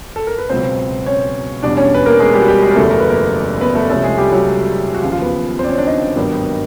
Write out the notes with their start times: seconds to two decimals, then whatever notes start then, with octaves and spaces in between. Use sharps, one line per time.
0.16 A4
0.27 A#4
0.38 B4
0.50 C#2 B2 F#3 B3 C4 C5
1.06 C#4 C#5
1.63 E2 B2 G3 D4 D5
1.77 C#4 C#5
1.95 B4
2.06 A#3 A#4
2.20 G#3 G#4
2.34 G3 G4
2.41 F#4
2.48 G3 G4
2.62 G#3 G#4
2.71 A#4
2.76 F#1 E2 C#3 F#3 A3 B3 A4
2.91 A#4
3.00 B4
3.10 A#3 A#4
3.61 B3 B4
3.75 A3 A4
3.89 C2 C3 F3 G#3 A3 C#4 A4
4.03 G#3 G#4
4.18 G3 G4
4.32 F#3 F#4
4.94 F#4
5.02 D#2 C#3 F3 F4
5.12 F4
5.22 B3 B4
5.59 C4 C5
5.64 D5
5.69 C#4 C#5
5.78 D4 D5
5.87 D#4 D#5
6.16 G#1 G2 D#3 F#3 B3